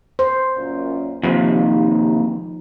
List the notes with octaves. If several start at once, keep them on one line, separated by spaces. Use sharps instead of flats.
C5
F#2 A#2 C#4
D#2 C3 F3 D#4